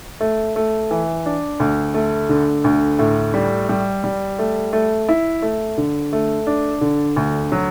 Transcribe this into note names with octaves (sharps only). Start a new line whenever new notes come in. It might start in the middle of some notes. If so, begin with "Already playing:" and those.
A3
A3
E3
D4
D2
A3
D3
D2
A2
G3
G3
G3
A3
A3
E4
A3
D3
A3
D4
D3
D2
F#3